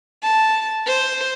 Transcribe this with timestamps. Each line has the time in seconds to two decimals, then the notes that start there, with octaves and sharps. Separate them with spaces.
0.23 A5
0.86 C5